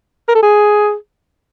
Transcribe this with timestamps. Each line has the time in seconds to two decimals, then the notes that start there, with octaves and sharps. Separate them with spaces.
0.28 A#4
0.35 A4
0.43 G#4